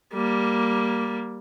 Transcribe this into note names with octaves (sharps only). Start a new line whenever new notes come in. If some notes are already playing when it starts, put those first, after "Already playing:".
G3 A#3